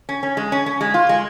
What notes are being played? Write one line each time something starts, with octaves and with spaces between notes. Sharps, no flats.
C#4
C#4
G#3
C#4
C#4
G#3
F4
G#3